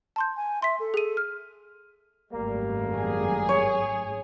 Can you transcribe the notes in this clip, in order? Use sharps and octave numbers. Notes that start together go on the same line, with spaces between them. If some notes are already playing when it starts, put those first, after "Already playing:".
A5 C6 G6
G#5
E5 C6 B6
A4
G#4 D#7
F6
G#1 F#2 G3 A3 A#3
G#4
C#5